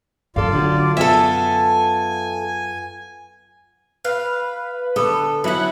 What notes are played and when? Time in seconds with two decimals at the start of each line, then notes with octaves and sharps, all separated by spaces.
0.36 F#2 F4 A4 D5 F5
0.52 D3 D4 F#4
0.97 B3 F4 A4 E5 G#5
4.05 B4 F5
4.96 D3 B3 A4
5.44 F#3 B3 C#4 E4 F#5 B5 F#6